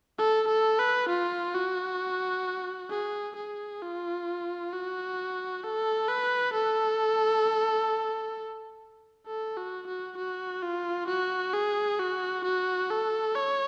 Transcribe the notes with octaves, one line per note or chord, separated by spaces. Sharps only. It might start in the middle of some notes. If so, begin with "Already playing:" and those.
A4
A4
B4
F4
F#4
G#4
G#4
F4
F#4
A4
B4
A4
A4
F#4
F#4
F#4
F4
F#4
G#4
F#4
F#4
A4
C#5